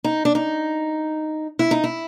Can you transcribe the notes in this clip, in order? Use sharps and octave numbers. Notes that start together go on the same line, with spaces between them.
D#4
D4
D#4
E4
D#4
E4